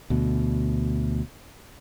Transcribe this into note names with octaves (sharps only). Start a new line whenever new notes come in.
D2 B2